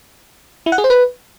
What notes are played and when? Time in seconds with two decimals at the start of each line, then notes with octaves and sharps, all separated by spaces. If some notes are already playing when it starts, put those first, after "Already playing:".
0.66 E4
0.72 F#5
0.78 G#4
0.84 C5
0.90 B4